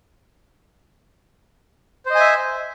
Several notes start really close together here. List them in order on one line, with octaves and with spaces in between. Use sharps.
C5 D#5 G#5 E5